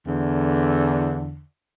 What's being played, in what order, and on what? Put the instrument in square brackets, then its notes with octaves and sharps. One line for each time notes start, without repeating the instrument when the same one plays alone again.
[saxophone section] E2 D3